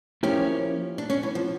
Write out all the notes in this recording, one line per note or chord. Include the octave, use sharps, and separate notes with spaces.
F3 A#3 C#4 E4 G4
D4
C#4
E3
F3